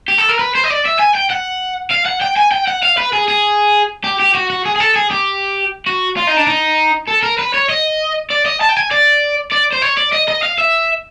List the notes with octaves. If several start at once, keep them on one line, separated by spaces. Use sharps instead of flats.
G4
A4
A#4
B4
C5
D#5
D5
E5
G#5
G5
F#5
F5
F#5
G5
G#5
G5
F#5
F5
B4
G#4
G#4
G4
G4
F#4
F#4
G#4
G#4
A4
G#4
G4
F#4
F4
D#4
D4
D#4
A4
A#4
B4
C#5
D#5
D5
D#5
A5
G5
G#5
D5
D5
C5
C#5
D5
D#5
D#5
F5
E5